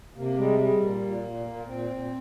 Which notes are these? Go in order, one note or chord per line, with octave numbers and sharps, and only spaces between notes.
C3 A#3
G3 G#3
G3 G#3
A#2 A#3
A#2
A#2
A#2
A#2 C4
A#2